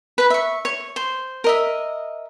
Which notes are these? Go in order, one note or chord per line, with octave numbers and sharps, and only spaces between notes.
B4 B5
E5 C#6
C#5
C5
A#4 D#5 E5